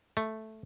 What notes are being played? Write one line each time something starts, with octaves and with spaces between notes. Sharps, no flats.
A3